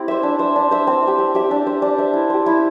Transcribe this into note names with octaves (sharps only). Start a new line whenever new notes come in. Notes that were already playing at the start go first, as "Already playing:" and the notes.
Already playing: C4 E4 G4
C5 E5
D4
C5 E5
D4
C5 E5
C4
G4 E5
C4
G4 E5
D4
C5 E5
D4
C5 E5
E4
G4 C5
E4